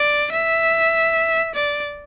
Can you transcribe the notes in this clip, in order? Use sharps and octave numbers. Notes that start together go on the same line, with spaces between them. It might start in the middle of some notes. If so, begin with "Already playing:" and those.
Already playing: D5
E5
D5